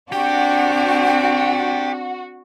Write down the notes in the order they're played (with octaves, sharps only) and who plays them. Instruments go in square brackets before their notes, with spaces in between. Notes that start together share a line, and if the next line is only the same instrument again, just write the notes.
[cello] C4 D4 [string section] F#4 [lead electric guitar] G4 [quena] G5